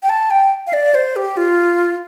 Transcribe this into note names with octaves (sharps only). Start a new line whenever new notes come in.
G5
A5
G5
F5
D5
C5
G4
F4